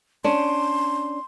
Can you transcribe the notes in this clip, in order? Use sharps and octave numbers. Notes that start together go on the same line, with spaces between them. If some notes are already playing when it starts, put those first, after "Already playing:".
C#4 D4 C6